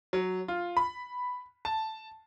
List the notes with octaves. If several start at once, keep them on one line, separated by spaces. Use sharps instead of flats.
F#3
F4
B5
A5